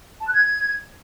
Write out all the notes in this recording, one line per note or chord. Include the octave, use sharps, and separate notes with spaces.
A5
F#6
G#6